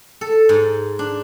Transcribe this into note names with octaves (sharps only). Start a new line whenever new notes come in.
A4
G#2
D4